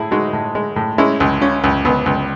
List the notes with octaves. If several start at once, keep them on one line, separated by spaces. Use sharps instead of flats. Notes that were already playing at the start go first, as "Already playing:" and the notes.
Already playing: A2 E4 G#4
G#3 D#4 F#4
A2
G#3
A2
G#3 C#4 E4
C#2
C#3 C#4
C#2
C#2 B3
C#2